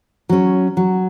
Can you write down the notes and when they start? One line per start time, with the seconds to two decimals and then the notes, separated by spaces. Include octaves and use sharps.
0.29 F#3 C#4
0.77 F#3